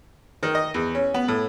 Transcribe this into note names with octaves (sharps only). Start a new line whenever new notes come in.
D#3
D#5
E2
C#4
B3
A2